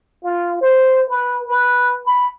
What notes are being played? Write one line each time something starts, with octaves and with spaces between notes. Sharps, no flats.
F4
C5
B4
B4
B5